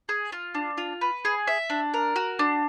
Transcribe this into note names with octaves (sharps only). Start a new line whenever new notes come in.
G#4
F4
D4
F4
B4
G#4
E5
D4
A#4
F#4
D4